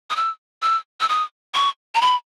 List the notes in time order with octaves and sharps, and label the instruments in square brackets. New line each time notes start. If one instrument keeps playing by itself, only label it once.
[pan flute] D#6
E6
E6
E6
D#6
C#6
A#5
B5